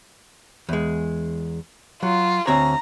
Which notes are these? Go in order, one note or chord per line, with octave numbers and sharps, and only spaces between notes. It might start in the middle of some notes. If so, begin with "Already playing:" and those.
E2 G#3
F#3 F4
D2 C4 C#5 A#5